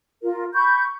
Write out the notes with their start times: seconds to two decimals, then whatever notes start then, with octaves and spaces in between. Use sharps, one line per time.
0.23 F4 A#4
0.54 B5 C#6 G6